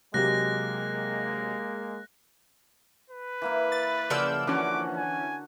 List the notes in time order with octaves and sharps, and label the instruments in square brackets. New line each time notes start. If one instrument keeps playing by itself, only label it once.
[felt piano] C3 F#3 G4 [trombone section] G#3 A#3 [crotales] F#6 A#6
[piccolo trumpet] B4
[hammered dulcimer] E3 A#3 E4
[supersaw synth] A6
[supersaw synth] C#3 E6 G6 [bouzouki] F3 A#3 D5 [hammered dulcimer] F#5
[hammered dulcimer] D3 F#4 F#5 [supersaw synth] E3 C#4 [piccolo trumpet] D6
[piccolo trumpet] G#5